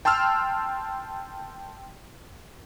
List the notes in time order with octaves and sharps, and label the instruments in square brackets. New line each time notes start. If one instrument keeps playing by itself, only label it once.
[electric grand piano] G5 A5 C6 E6 F6